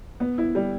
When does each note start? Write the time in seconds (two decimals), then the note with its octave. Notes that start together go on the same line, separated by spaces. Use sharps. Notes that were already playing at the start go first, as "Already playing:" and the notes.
0.20 B3
0.38 E4
0.55 G3